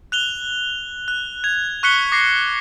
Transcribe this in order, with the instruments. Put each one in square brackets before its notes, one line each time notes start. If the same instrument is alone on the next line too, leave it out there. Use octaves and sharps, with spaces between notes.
[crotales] F#6 F7 G7
F#6
G#6 F7
C#6 F#6 B6 C#7 G7
D6 A#6 C7